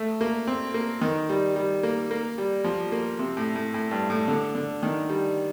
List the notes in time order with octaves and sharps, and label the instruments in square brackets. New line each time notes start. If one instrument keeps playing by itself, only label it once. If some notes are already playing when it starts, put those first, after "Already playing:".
Already playing: [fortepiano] A3
A#3
C4
A#3
D#3
G3
G3
A#3
A#3
G3
F3
A#3
C3
A2
A2
A2
G2
A2
D3
D3
D#3
G3